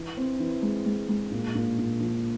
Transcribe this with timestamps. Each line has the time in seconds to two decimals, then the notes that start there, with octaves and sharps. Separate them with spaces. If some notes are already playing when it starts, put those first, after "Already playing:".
Already playing: E3
0.17 C4
0.40 E3
0.63 G#3
0.86 G#3
1.09 G#3
1.32 A#2
1.55 A#2
1.78 A#2
2.00 F3